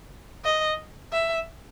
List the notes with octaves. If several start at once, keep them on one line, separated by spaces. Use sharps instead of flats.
D#5
E5